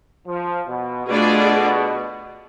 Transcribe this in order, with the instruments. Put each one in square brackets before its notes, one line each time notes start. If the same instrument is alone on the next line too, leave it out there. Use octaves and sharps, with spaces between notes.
[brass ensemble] F3
B2
[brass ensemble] B2 [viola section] A3 D4 F4 G#4 D5